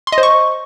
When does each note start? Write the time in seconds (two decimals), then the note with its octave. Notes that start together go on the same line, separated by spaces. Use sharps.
0.07 C6
0.12 D#5
0.18 C5
0.23 C#6